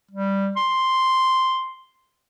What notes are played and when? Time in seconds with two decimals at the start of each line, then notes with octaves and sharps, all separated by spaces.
0.11 G3
0.57 C6